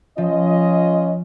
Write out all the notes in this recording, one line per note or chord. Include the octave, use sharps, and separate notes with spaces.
F3 C#4 F4 D#5